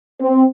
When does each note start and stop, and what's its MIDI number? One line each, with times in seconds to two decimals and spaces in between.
0.21 0.43 60